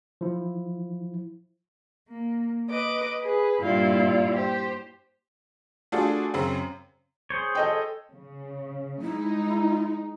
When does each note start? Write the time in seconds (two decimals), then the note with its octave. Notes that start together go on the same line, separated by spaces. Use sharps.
0.21 F3 E4
2.09 A#3
2.69 B4 D#5 D6
3.21 G#4 B4
3.60 G2 A#2 E4 F4 D5
4.33 G4 C5
5.92 A3 D4 F4 F#4 G#4 A4
6.34 F#2 C#3 C4
7.30 G#4 C5 C#5
7.55 A4 D#5 G5
8.11 C#3
9.02 G#3 D#4 E4